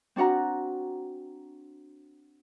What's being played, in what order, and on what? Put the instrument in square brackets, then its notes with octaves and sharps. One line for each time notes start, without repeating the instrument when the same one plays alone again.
[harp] C4 D4 F#4 F#5 A#5